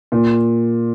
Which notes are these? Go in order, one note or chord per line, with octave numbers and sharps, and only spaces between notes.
A#2